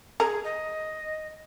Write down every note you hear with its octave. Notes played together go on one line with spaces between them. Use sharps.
G#4 A#4
D#5